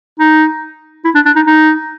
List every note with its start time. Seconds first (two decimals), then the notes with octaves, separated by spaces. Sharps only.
0.19 D#4
1.04 E4
1.15 D4
1.26 D4
1.36 D#4
1.47 D#4